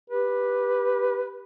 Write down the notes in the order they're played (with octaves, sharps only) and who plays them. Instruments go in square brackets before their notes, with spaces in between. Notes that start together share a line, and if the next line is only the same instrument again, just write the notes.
[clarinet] G4 [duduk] B4